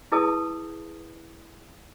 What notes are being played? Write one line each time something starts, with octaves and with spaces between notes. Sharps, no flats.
E4 G#4 B4 A5 D#6